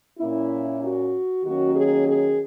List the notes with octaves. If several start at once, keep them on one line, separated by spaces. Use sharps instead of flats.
A#2 A#3 C#4 E4
F#4
D#3 F#3 A#3 C#4 F#4
G#4
G#4